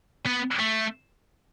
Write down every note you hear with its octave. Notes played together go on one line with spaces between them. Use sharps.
B3
A3